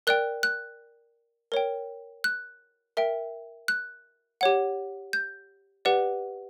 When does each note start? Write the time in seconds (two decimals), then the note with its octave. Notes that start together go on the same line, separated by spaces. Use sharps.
0.07 A#4 D5 G5 F#6
0.43 F#6
1.52 A#4 C#5 G5
2.24 F#6
2.97 A#4 E5 G5
3.68 F#6
4.41 G4 C#5 F#5
5.13 G6
5.85 G4 B4 D5 F#5